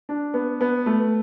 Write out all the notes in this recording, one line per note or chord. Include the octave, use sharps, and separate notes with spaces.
D4
B3
B3
A3